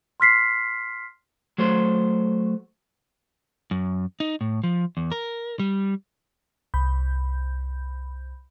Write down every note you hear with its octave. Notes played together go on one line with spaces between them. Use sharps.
C6 F6 B6 C7
F#3 A3 C5
F#2
D#4
A2
F3
E2
A#4
G3
C2 B5 G6